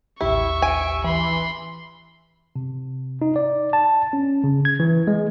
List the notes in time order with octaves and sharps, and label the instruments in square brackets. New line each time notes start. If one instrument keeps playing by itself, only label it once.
[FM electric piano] A1 D#2 G4 [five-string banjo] E4 [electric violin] E5 C#6
[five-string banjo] G#5 [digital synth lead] D7
[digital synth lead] E3 [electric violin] B5 C6
[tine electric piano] C3
D#4
D5
A5
C#4
C#3
G#6
E3
G#3